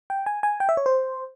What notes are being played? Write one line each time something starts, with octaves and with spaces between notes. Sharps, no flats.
G5
G#5
G#5
G5
E5
C#5
C5